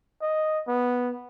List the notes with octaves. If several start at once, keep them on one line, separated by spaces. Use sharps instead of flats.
D#5
B3